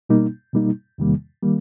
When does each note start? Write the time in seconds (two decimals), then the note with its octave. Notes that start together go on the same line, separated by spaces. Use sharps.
0.09 B2 G3 A#3 D#4
0.53 B2 G3 A#3 D#4
0.98 E2 C3 D#3 G3 A#3
1.43 D#3 G3 A#3